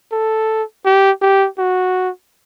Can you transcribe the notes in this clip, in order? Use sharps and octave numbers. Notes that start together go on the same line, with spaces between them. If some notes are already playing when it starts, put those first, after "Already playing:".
A4
G4
G4
F#4